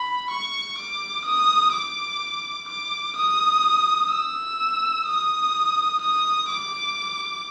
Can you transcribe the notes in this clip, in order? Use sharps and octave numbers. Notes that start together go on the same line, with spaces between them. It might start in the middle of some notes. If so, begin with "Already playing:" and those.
Already playing: B5
C#6
D6
D#6
D6
D6
D#6
E6
D#6
D#6
D6